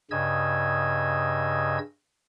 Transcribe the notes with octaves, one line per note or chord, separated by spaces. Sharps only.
G2 C#3 D#5 E6 G#6